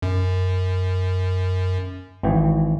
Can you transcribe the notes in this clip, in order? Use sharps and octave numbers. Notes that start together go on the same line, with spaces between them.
F#2
G#1 E3 G5